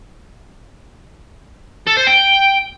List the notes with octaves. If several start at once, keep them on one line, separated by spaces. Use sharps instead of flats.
A4
C5
G5